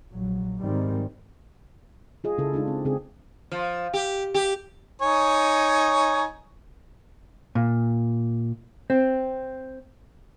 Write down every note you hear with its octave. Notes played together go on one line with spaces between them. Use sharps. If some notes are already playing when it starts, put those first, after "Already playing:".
A#1 F#3
G#2 D#3 G3 C4
F4 G#4 D#5
C#3 E4 A4
G#3 D4 D#4 F4
C4
C#3 C4 G#4
F3
G4
G4
D#4 C#5 G#5
A#2
C4